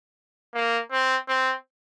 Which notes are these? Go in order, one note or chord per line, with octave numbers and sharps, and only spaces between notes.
A#3
C4
C4